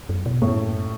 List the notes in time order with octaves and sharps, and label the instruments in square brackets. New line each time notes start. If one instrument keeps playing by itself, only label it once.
[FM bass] F#2
B2
[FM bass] F#2 [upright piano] A2